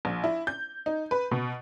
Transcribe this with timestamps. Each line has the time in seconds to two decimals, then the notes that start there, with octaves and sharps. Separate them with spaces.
0.05 A#1
0.24 E4
0.47 G6
0.86 D#4
1.11 B4
1.31 B2